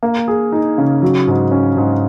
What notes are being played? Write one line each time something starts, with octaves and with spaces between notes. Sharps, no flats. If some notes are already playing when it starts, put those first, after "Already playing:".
A#3
G#4
D#4
C#3
F#3
G#2
C#4
G#2